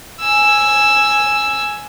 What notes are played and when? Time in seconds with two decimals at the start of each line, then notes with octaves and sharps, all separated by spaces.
0.21 G#5 E6